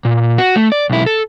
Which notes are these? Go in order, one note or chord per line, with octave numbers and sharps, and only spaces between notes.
A#2
F#4
A3
D5
B1 E4
A4